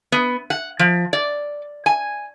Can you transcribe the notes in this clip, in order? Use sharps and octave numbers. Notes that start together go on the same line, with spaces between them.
B3
F#5
F3
D5
G#5